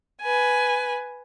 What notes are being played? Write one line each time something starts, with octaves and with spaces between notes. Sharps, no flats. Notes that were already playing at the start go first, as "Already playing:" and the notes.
B4 G#5